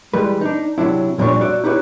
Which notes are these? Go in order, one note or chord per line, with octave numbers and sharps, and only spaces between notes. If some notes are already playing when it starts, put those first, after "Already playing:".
E3 G3 G#3 B4
D4 D#4
C3 F#3 D4 E4
F2 A#2 G3 D4 C#5
F#4 D5 E5
D#4 E4 G4 G#4 B4 C#5